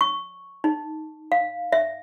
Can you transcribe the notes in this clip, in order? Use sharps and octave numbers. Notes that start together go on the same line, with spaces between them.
C#6
D#4
F5
E5